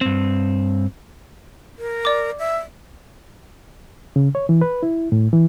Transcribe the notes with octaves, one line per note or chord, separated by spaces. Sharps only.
G2 C4
A#4
D5 D6
E5
C#3
C#5
E3
B4
E4
A2
E3